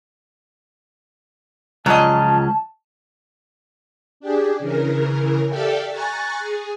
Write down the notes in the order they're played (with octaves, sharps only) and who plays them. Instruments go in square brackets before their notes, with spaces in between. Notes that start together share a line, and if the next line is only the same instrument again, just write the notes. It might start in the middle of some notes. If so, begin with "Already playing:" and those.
[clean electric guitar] C#2 F3 C#4 [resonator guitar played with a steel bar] F#3 D#5 [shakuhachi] A5
[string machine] D4 G4 G#4
C#3 E3 A#4
G4 A4 D5 E5 F5 G5
G#5 A#5 C#6 F#6 A6
G#4